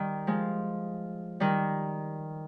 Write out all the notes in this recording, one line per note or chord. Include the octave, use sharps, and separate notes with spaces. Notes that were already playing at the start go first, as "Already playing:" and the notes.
Already playing: D#3 G3
F3 G#3
D#3 G3